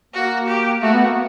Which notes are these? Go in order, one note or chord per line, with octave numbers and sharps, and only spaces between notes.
A#3 F#4
G4
A3 F#4
B3
A#3